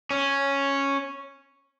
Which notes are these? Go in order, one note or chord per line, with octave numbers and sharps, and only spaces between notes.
C#4